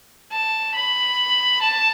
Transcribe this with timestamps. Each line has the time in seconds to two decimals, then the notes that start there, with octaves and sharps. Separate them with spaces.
0.32 A5
0.75 B5
1.62 A5